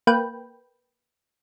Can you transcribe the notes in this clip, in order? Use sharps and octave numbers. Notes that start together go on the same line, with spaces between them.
A#3 B4 G5